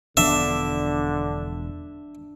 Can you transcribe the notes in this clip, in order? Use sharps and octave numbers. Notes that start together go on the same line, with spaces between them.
E1 D3 F3 B3 D4 E5 D6